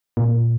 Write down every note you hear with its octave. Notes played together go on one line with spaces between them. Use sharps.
A#2